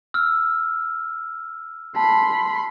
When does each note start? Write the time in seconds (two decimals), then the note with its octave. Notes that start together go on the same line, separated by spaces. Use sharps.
0.14 E6 F6
1.96 A5 B5 C6